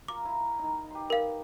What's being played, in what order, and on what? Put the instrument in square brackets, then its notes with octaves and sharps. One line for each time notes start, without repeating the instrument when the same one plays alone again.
[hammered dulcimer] F4 A#4 [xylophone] D6
[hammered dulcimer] E4 A#4
D#3 D#4
G4 B4 C6
[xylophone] A#4 F5